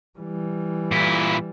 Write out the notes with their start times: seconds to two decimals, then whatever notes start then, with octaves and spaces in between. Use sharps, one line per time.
0.19 E3 G3
0.91 A#2 E4